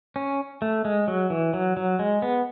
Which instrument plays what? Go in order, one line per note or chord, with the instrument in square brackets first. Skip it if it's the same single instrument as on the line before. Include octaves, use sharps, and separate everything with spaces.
[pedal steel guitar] C#4
A3
G#3
F#3
E3
F#3
F#3
G#3
B3